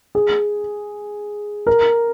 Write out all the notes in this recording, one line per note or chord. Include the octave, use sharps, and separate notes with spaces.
G#4
A#4